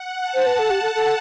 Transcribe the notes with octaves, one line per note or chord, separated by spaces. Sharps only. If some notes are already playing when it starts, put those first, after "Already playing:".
Already playing: F#5
A5
C5
B4
A4
G4
A4
A4